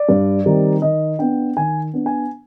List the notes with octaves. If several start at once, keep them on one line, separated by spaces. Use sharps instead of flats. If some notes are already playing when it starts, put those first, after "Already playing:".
Already playing: D5
G2
D#3 G3 C4 D#4
D#3 D#5
B3 D4 G5
D#3 G#5
B3 D4
G#5